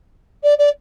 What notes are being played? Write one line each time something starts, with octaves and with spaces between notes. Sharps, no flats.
D5
D5